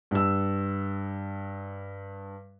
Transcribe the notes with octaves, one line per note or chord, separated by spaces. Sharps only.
G2 E6